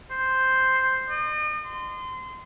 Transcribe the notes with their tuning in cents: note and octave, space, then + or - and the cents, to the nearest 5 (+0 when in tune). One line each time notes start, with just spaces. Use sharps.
C5 +0
D#5 -40
C6 -25